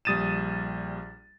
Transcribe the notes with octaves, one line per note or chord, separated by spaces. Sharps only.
A#1 G3 D#6 A6 D#7 E7